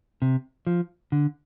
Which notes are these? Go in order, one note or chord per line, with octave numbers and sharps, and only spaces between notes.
C3
F3
D3